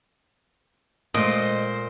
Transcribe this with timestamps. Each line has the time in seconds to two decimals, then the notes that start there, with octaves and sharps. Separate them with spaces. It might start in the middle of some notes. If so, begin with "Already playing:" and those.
1.14 A#2 G#3 A3 C5 D#5